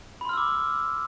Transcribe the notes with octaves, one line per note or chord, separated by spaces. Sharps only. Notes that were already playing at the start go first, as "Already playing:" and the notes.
B5 C6 D6 E6 F6